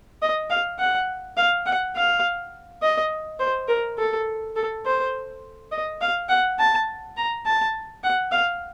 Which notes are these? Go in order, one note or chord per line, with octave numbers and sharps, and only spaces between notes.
D#5
F5
F#5
F5
F#5
F5
D#5
C5
A#4
A4
A4
C5
D#5
F5
F#5
A5
A#5
A5
F#5
F5